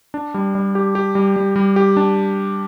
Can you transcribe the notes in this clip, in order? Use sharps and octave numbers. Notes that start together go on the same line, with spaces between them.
D4
G3
G3
G4
G4
G3
G3
G3
G4
D4